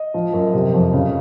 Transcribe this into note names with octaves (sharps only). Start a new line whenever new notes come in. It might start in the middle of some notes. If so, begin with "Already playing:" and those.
Already playing: D#5
F3
F#2
C3
F2
C#3